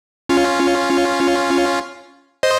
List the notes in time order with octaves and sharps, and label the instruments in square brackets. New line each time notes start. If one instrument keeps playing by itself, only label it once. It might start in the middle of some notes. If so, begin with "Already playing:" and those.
[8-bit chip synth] C#4 F4
C5 D#5